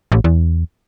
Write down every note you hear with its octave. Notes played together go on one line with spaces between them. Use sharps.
A1
E2